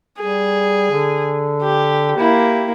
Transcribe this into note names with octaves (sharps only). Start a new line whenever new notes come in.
G3 G#4
D3
G4
A#3 E4 G4